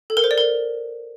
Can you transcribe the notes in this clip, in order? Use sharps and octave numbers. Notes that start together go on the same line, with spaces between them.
A4
A#4
C5
D5
A#4